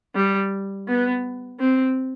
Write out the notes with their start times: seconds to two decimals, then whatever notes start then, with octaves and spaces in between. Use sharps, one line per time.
0.15 G3
0.88 B3
1.59 C4